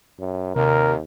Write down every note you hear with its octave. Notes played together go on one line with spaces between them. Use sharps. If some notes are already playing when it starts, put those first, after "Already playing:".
F#2
D#2 C3 A#4